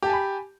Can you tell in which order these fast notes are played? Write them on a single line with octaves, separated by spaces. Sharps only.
G4 A5 G#5 B5